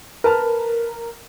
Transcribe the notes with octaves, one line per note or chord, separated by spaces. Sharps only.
A#4 B4 A5 F6